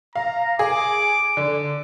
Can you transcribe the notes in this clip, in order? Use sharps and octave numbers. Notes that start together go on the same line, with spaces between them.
F5 A#5
G#4 D6
D3